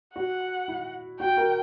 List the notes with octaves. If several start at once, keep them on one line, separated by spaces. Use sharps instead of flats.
F#4 F#5
E4
F#4 G5
F#4 A#4